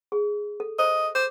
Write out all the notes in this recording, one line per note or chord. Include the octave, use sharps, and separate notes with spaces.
G#4
A4
C5 D#5
C5 D6